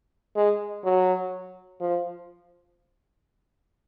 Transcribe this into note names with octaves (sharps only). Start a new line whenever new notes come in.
G#3
F#3
F3